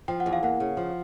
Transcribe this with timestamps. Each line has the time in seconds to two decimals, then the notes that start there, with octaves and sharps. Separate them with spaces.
0.08 F3 G5
0.20 F#5
0.26 E2
0.33 F5
0.43 A#3 F#5
0.60 C#3
0.77 F3